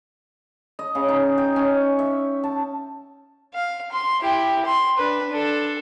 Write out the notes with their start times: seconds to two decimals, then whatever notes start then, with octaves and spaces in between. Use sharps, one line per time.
0.79 D#5
0.95 C#3
1.08 D#4
1.38 G5
1.56 C#4
1.99 E5
2.44 A5
3.54 F5
3.92 C6
4.20 E4 G4
4.65 C6
4.97 D4 B4
5.30 D4 A4